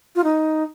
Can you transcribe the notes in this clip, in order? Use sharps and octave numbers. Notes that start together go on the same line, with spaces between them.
F4
D#4